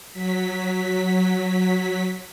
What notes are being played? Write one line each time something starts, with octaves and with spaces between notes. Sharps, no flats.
F#3 B6